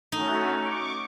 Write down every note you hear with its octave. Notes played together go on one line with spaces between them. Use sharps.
A3 C#4 D#4 F#4
C#6 D6